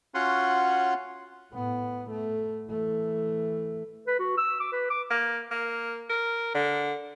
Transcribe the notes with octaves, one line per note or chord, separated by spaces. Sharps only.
C#4 F4 F#4 C#5 F#5 C6
A2 B3
A3
E3 A3
B4
F#4
E6
D6
B4
D6
A#3
A#3
A#4
D3